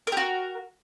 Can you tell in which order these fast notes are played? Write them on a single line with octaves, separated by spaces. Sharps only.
A#4 G4 F#4